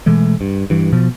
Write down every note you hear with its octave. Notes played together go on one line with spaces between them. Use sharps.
B2 E3 G#3 A3
G2
G2 E3
B2 F3